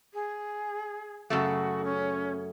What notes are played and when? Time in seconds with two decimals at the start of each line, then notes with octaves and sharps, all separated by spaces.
0.14 G#4
1.30 F#2 C#3 A3 F#4
1.84 C#4